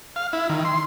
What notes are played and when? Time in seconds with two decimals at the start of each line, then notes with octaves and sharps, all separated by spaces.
0.16 F5
0.33 E4
0.49 D#3
0.65 C6